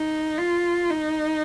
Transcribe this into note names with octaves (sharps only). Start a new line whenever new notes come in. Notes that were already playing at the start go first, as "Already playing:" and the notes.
Already playing: D#4
F4
D#4